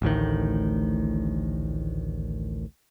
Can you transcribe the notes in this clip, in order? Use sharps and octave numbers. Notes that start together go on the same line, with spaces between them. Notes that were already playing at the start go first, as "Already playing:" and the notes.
A1 D2 A2 D#3